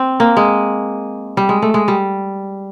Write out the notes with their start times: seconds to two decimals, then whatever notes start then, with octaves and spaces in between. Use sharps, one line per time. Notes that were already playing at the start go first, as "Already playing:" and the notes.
Already playing: C4
0.20 A#3
0.37 G#3
1.37 G3
1.49 G#3
1.62 A3
1.74 G#3
1.88 G3